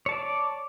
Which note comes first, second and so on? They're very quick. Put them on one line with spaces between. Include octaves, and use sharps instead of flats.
C#5 A5 D5